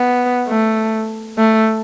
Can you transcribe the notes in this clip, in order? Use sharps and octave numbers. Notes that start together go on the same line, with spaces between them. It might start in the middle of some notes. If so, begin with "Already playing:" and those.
Already playing: B3
A3
A3